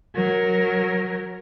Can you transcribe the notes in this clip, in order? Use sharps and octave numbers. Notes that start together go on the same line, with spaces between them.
F#3 A#4